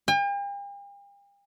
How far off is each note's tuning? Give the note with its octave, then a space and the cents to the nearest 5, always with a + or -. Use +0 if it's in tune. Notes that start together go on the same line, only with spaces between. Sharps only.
G5 +45